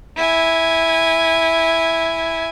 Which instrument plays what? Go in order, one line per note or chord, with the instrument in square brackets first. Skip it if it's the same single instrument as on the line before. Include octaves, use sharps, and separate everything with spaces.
[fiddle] E4 G#5